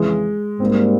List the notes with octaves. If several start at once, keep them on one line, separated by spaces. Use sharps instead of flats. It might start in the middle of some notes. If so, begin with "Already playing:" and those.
Already playing: F2 C#3 E3 G#3
G#2 G3 A#3 C4